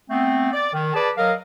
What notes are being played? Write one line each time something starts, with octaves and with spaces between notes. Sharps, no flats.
A3 B3 C4
D5
D#3
G#4 B4 D5 A5
F#3 A#4 D#5 F5